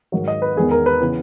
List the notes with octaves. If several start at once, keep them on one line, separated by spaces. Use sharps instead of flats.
G#2 D#3 F#3
D#5
B4
E2 D#3 G#3 B3 G#4
A#4
B4
C#3 E3 B3